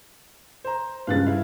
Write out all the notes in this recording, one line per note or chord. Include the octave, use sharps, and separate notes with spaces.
C5 A#5
C#2 G2 F5 F#6 A6
E4 F5